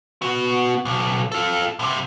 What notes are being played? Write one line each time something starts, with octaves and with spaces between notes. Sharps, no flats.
B3 F#4
B1
F4 A4
G2 C3